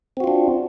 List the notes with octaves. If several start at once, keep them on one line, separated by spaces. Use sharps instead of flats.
C4 D4 F4 F#4